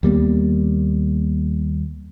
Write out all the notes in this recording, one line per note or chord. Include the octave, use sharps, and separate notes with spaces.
D#2 G3 A#3 B3